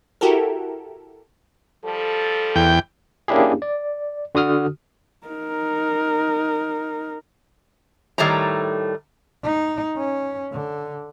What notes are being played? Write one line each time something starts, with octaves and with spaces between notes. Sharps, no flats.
E4 F#4 G4 A4 A#4
F3 G3 A4
E2 G5
A#3 C#4 D4 E4 G4 G#4
D5
D3 F#4 D#6 F6
D#4 A#4
A2 D#3 G3 A3 C#5 A#5
D#4
C#4
D3